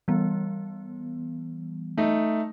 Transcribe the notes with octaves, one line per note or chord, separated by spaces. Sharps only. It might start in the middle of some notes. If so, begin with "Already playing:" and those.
E3 G3 B3
A3 D#4